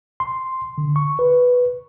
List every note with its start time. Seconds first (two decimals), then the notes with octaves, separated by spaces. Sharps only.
0.20 C6
0.78 D3
0.96 C#6
1.19 B4